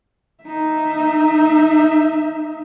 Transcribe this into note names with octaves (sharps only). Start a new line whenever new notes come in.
D#4 E5